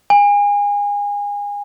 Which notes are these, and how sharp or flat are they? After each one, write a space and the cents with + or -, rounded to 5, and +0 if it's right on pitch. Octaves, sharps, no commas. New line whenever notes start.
G#5 -30